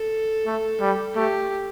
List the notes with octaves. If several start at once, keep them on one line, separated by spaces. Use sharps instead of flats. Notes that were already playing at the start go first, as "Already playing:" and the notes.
Already playing: A4
A3
G3
A3 G4